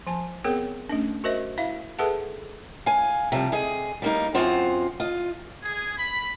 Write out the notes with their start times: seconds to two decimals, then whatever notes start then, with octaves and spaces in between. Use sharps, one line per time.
0.07 F3 G#5 A5
0.44 B3 C4 G#4 A#4 C#5 G5
0.89 A3 C#4 D4
1.24 F#4 A#4 C5 D#5 E5
1.58 E4 E5 F5
1.99 G#4 A4 B4 E5 F#5 A5
2.86 F5 G#5
3.32 C3 F3 G3
3.52 C3 G#4 D#5
4.02 G3 A#3 D#4
4.34 F#2 C4 F4 G#4 C5 F#5
5.00 F4 D#5
5.63 G#4
5.97 B5